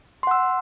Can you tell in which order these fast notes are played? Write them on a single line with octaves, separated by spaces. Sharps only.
C6 F#5 E6